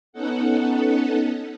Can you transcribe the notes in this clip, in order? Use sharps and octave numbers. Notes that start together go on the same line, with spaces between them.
B3 C#4 D#4 A4 F#5